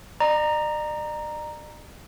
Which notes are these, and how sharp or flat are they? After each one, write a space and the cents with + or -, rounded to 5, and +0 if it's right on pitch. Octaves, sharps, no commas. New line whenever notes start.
D5 +45 A#5 +0